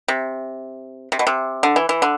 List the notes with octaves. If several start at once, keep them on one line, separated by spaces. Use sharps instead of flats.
C3
C3
B2
C3
D3
E3
E3
D3